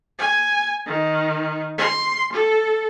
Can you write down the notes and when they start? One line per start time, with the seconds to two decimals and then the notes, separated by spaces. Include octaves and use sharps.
0.18 G#5
0.86 D#3
1.78 C6
2.32 A4